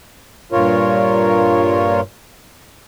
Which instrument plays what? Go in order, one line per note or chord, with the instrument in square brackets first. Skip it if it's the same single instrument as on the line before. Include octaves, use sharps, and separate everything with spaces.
[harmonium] G2 A#2 F4 A#4 C#5